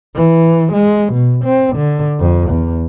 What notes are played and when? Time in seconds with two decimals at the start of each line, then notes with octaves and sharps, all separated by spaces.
0.15 E3
0.72 G#3
1.13 B2
1.45 C4
1.76 D3
2.20 F2
2.50 E2